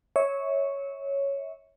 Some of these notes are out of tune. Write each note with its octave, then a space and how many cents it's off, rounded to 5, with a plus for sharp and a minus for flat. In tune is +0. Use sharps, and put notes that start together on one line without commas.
C#5 +0 E5 -30